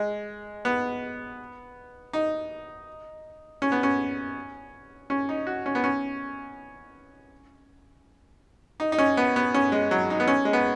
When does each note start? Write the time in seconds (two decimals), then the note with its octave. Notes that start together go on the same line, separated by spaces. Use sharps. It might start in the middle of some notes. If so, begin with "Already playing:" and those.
Already playing: G#3
0.65 B3
2.13 D#4
3.62 C#4
3.72 B3
3.83 C#4
5.10 C#4
5.29 D#4
5.47 F#4
5.66 C#4
5.75 B3
5.84 C#4
8.80 D#4
8.92 D#4
8.98 C#4
9.17 B3
9.36 B3
9.54 C#4
9.72 G#3
9.91 F#3
10.10 D#4
10.20 B3
10.28 C#4
10.45 G#3
10.53 B3